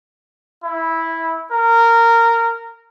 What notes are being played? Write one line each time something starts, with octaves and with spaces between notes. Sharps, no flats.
E4
A#4